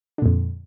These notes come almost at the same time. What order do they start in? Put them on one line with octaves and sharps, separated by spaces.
D3 A#2 F2